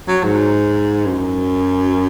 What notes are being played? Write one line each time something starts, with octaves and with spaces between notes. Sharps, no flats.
F#3
G#2
F#2